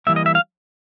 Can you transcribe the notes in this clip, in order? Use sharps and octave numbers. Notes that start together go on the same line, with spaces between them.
E3 G3 A#3 E5
D#5
E5
F5